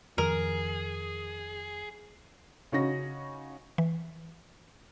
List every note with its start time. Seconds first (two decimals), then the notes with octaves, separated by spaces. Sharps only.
0.18 F2 D#3 F3 G#4 A#4
2.72 C#3 C#4 D#4 F#4 A#6
3.78 E3